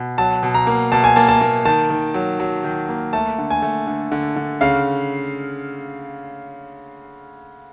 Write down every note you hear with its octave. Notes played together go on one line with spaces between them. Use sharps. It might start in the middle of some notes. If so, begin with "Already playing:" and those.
Already playing: B2
F#3 A5
B2
A#5
A#3
B2 A5
G#5
A#3 A5
A5
A#3
D#3 A5
D#3
F#3
F#3
D#3
A#3
A3 A5
D3
G#5
A3
D3
D3
D3
C#3 F5